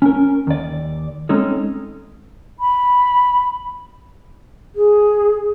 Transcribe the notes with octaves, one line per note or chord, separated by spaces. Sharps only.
C#4 A#4
D#2 D5
G#3 C4 C#4 D#4 A4
B5
G#4